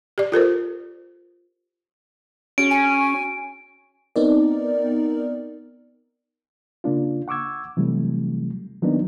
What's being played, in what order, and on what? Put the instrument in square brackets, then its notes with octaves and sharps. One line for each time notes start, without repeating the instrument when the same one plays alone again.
[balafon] G4 D5
F4 A4 A#4 C5
[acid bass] C#4 [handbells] F#4 G#4 C#5 [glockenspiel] D7
[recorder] G#5
[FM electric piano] B3 C4 D#4 A#4 D5
[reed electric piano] C#3 A#3 D4 F4
F#5 C#6 D6 E6 G#6
C3 E3 F#3 G3 A3
D#3 F#3 A#3 B3 D4 D#4